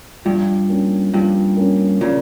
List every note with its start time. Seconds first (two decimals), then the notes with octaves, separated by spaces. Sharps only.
0.25 G2 F3
0.69 A#3 C#4
1.14 G2 F3
1.57 A#3 C#4
2.01 A#2 C#3 F3